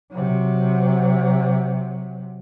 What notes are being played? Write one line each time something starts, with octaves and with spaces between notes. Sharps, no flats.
C3 F#3